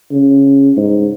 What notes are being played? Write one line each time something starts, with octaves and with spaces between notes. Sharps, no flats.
C#3
G#2